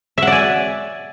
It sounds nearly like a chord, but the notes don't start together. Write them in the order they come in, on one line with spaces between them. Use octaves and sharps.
E5 F#5 D5 G#5